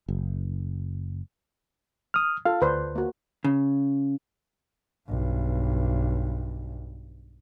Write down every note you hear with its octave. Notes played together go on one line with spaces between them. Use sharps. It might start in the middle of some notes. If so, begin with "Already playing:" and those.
F#1
D#6 F6
F4 A4 F5
D2 B4 C5 D5
A#3 F#4
C#3
B1 G2